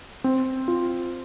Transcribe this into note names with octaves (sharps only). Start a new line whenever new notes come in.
C4
F4